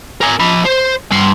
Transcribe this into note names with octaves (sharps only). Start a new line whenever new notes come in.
A#4 G#5
F3 B5
C5
G2 C6